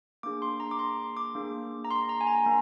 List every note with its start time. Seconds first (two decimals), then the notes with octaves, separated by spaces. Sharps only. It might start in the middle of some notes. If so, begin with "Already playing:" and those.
0.23 A#3 D4 G#4 D6
0.42 C6
0.60 A#5
0.71 D6
0.79 C6
1.17 D6
1.35 A#3 D4 G#4
1.85 A#5
1.91 C6
2.09 A#5
2.21 G#5
2.27 A#5
2.46 A#3